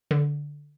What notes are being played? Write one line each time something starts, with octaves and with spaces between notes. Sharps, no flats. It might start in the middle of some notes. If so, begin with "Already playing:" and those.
D3